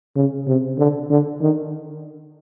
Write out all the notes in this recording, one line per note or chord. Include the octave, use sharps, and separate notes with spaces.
C#3
C3
D3
D3
D#3